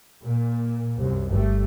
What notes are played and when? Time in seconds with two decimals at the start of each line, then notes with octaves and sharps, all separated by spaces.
0.22 A#2
0.98 C2 F#2
1.31 G1 G3 A3